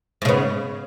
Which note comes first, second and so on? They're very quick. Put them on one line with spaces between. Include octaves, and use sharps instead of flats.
G#2 C#3 B3